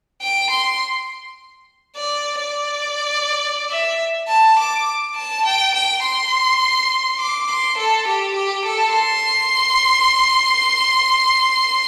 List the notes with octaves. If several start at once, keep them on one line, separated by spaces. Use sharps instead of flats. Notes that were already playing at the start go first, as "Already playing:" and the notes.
G5
C6
D5
D5
E5
A5
D6
A5
G5
G5
C6
D6
C6
A4
G4
G4
A4
C6